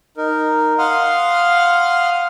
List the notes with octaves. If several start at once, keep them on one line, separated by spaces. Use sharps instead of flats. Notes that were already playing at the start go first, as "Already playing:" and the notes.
D#4 A#4
F5 F#5 C6 D#6 F6